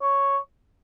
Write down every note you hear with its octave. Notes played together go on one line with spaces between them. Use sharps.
C#5